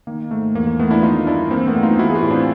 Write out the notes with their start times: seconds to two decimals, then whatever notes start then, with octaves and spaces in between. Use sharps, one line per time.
0.07 D#3 A#3
0.31 G#2 A3
0.55 E2 A#3
0.67 A#3
0.79 E3 A3 B3
0.91 D4 E4
1.03 D#3 D#4 F4
1.27 G2 D4 E4
1.51 E3 A#3 C4
1.67 A3 B3
1.75 G2
1.83 D#4 F4
1.98 E3 E4 F#4
2.10 G#4
2.15 F4 G4
2.22 A2
2.30 C4 D4